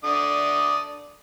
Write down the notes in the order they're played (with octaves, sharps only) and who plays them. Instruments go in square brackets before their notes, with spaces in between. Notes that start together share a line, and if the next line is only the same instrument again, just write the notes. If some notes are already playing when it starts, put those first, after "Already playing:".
[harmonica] D3 D5 D#6